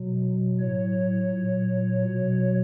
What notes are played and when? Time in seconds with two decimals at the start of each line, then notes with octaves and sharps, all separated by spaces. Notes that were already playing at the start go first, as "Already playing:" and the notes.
Already playing: B2 F#3
0.60 A2 F#3 C#5
1.32 A#2 F#3
2.04 B2 F#3